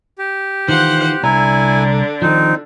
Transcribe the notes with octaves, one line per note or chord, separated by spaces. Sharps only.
G4
D#3 E3 F4 C5 F#5
C2 D3 E4 D5 G#5 A#5
D#3 F3 C4 D#4